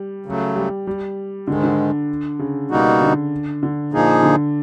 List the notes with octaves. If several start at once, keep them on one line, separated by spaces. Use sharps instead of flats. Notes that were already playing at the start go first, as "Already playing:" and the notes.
Already playing: G3
C#3 F#3 A3
G3
G3
G#2 D3 D#3 G#3
D3
C#3
B2 G3 A#3 D#4 F#4
D3
D3
A#2 F3 A#3 D#4 G#4
D3